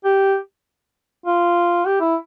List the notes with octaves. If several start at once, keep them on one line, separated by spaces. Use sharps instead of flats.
G4
F4
G4
E4